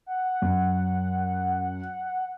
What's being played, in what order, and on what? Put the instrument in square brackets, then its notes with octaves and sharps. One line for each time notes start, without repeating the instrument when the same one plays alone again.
[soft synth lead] F#5
[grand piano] F#2